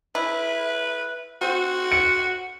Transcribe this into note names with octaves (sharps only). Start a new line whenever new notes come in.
E4 B4
C4 F#4
C#7